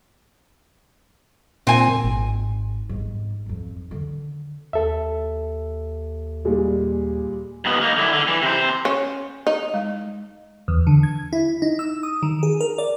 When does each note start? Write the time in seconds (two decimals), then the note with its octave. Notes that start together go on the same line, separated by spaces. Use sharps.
1.67 A#2 C4 G#5
2.03 G#1
2.89 G1 G#2
3.46 G#1 F2
3.91 D3 D#3
4.73 D#2 A4 E5
6.45 A#2 G3 G#3
7.65 D#2 B3
7.81 A#3 D#4
7.97 D3 E4
8.13 D3
8.28 E3
8.42 C3 C5
8.85 C#4
9.47 D#4
9.74 G#3
10.68 E2
10.87 D3
11.03 G#6
11.33 E4
11.62 D#4
11.79 E6
12.03 D#6
12.23 D#3
12.43 G#4
12.61 A#4
12.78 D5